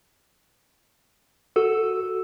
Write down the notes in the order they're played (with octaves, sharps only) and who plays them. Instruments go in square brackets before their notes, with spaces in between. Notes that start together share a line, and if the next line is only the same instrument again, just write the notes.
[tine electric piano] F#4 E6 [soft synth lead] A4